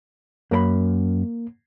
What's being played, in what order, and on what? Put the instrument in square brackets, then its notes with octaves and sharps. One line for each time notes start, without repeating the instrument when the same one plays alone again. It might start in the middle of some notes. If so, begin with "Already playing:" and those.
[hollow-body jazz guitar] F#2 A#4 B5 [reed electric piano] A#3